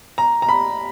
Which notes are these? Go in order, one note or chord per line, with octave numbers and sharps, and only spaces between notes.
A#5
A#5
B5